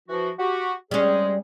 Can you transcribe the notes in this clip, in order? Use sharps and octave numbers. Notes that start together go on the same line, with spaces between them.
E3 F3 F#4
F#4 G4
C3 G3 G#3 C#4 G#4